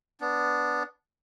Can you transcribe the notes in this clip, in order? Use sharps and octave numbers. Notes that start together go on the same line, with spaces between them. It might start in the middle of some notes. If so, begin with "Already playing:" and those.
B3 D4